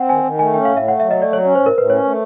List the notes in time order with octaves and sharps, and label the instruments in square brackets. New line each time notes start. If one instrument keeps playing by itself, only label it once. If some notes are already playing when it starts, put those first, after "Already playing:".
Already playing: [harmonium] C4 [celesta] F#5 G5
[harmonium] D#3 [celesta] G#5
[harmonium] D#3
[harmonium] A3 [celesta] G#5
[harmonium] C#4 [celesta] G5
[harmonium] A2 [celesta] F5
[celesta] E5
[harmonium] A3 [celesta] F#5
[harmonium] F#3 [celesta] E5
[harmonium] A3 [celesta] D#5
[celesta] D5
[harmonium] F#3 [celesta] C#5
[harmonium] C#4
[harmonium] A2 [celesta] C5
[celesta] A#4
[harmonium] A2 [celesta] B4
[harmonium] C#4 [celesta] C#5
[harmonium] A3